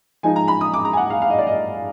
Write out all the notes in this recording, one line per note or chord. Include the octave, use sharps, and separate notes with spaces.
F3 G#3 D#4 G#5
A#5
B5
D#6
D6
A#5
G#5
F#5
F5
F5
D#5
D5
D#5